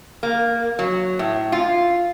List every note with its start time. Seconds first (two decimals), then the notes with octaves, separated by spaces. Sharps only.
0.23 A#3
0.79 F#3
1.19 A2
1.52 F4